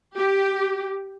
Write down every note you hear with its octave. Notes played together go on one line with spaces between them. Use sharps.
G4